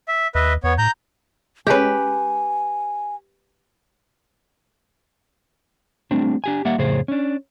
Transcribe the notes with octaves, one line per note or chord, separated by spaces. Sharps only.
E5
D#2 B4 D#5 E5
E2 B3 C#5
A2 A#5 G6
G#3 C#4 G4 B4 G#5
G3 A3 C4 D4
D4 G4 G#5
G3 A#3 E5 F#5
F2 A2 C#3 G#4 C5
C#4 D4